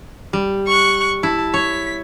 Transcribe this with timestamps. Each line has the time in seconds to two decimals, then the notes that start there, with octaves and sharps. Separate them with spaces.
0.33 G3
0.68 C#6 F#6
1.23 E4 A5
1.54 C#5 B6